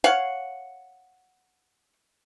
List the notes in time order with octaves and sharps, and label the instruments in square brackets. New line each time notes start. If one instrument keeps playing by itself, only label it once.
[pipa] C#5 F5 F#5